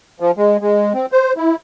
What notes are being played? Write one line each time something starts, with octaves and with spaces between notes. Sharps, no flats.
F3
G#3
G#3
C4
C5
E4